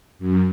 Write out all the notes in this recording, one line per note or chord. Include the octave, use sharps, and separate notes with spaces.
F#2